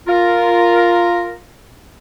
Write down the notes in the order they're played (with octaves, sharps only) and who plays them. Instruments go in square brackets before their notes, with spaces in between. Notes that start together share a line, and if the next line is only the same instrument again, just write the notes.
[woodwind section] F4 A#4